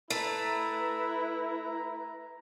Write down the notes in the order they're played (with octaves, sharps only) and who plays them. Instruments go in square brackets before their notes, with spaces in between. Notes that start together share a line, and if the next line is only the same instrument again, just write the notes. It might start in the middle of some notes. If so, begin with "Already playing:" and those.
[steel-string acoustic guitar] A3 [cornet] E4 [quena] B4 [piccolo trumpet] A#5